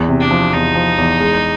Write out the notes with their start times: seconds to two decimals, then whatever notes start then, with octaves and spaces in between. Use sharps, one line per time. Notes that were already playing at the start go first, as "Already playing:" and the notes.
Already playing: E2
0.09 C3
0.20 D4
0.31 F3
0.53 E2 D#4
0.75 F3
0.98 E2
1.20 G#3